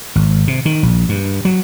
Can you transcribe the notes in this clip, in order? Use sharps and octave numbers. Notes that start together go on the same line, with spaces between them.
G#1
C3
D#3
A#1
G2
F#3